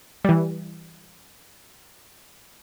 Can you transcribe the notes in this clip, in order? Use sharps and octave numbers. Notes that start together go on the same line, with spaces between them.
E3 G3